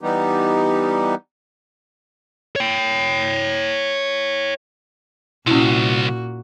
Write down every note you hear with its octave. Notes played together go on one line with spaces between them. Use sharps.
E3 G3 B3 D#4 G4
C#5 G5
C2 A#2 C#4 E4 F#4